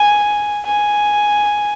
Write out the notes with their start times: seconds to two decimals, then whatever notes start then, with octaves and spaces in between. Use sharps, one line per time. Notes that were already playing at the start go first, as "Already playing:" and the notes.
Already playing: G#5
0.65 G#5